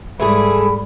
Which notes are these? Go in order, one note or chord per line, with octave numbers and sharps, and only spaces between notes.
G#2 E3 G3 A3 G#4 B5